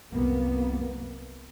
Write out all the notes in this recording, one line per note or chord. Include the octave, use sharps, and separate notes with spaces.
C2 F#2 A#3 B3